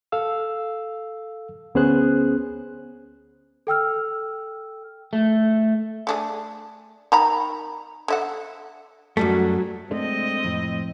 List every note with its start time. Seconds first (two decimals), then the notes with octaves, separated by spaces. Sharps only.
0.12 A4 F5 E6
1.75 D2 B3 C#4 G#4 C5 F#6
3.67 A4 G5 E6 F6
5.13 A3
6.07 A3 D4 G#4
7.12 D#3 A#5 B5
8.08 D3 E5 F#5
9.17 F#2 F#3 G3 A3 F#4
9.91 G#3 A3 C4 D4 D#5
10.45 F2 A2